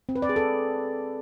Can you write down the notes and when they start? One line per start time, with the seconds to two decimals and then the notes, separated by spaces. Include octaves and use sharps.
0.09 C4
0.16 B4
0.22 D5
0.29 G#4
0.36 A4